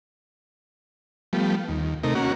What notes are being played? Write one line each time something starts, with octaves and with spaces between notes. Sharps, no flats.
F3 G3 A3 B3
D#2
C3 A3 D#4 A#4
A#3 C#4 F#4